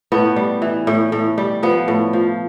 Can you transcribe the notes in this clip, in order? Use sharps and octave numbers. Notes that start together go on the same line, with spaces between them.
A2 B3
G3
E3
A2
A2
G3
F3 B3
A2
F3